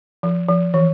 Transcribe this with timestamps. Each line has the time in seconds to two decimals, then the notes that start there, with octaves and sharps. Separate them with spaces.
0.23 F3
0.48 F3
0.74 E3